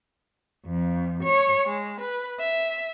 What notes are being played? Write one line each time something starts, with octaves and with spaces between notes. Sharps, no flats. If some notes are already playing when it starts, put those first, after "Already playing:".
F2
C#5
G#3
B4
E5